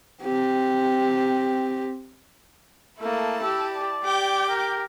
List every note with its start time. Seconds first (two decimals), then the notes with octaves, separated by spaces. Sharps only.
0.23 C4 G4
3.00 A3 A#3 E4 A5
3.43 G4 E6
3.73 D5
4.04 G4 G5 D6 G6
4.49 A#4